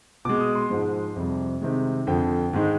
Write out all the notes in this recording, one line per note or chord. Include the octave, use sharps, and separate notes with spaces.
B2 G#3 D6
D#6
C6
G#2 F3 G#3
F2 C3 G3
C3 D#3 G#3
F2 D3 F3 G5
G#2 D#3 G#3